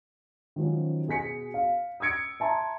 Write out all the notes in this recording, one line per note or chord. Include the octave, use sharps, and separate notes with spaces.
D#3 F3 F#3 C#4
B2 G#4 G#5 B6 C#7
F5
D#6 E6 G#6 C#7 D7
E5 A5 A#5 C6